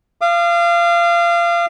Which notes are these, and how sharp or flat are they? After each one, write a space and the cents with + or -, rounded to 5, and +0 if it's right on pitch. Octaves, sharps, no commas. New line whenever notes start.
F5 -25 D6 +45